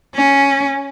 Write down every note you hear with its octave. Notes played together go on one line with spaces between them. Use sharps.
C#4